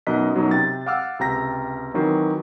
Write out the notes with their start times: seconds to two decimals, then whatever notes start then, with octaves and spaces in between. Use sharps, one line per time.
0.07 F#2 B2 D#4 D#5 F#6 B6
0.35 F#2 B2 F#3 D#4
0.51 C3 G5 A6
0.86 F5 F#5 D6 E6 F6
1.19 C#2 C3 G5 A#5 A#6 B6
1.94 D#3 E3 F#3 C4